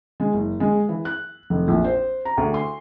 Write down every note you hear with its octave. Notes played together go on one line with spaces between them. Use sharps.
G#3
F#1
G#3
E3
F#6
F1
A#1
C5
A#5
D2
C6